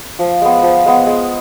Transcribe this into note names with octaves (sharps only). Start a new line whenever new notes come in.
F3
G#3 B3
F3
G#3 B3
G#3